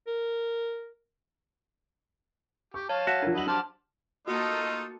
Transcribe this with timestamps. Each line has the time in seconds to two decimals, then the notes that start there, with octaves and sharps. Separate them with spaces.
0.07 A#4
2.74 G4 C#6
2.89 C#5 F5 A5
3.07 F#4 E5
3.22 F3 D4 A#4
3.35 F#3 E4 D#5 F#5 F#7
3.48 G4 C5 A5 D6 F6
4.28 A3 A#3 D#4 F4 F#4 A4 D#5 C#7